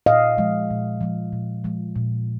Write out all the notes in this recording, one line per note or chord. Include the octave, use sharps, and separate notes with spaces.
A#2 D#5 F5
F3 G#3
A#2
F3 G#3
A#2
F3 G#3
A#2